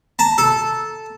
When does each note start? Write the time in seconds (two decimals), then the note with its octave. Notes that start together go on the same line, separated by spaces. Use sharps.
0.19 A5 A#5
0.38 A4